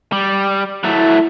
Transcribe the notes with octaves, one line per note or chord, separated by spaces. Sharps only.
G3
F#3 A3 E4